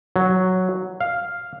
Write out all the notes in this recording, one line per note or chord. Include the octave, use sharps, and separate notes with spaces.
F#3
F5